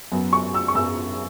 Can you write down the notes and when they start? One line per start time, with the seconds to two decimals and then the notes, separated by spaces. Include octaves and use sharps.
0.12 F#2 F#3 B3
0.33 C#6
0.54 E6
0.68 C#6
0.75 F#2 F#3 B3 E6